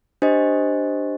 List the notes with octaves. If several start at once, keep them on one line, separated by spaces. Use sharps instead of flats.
D4 G4 C5 D#5